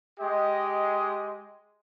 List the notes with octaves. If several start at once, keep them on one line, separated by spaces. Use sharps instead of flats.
G#3 G4 D#5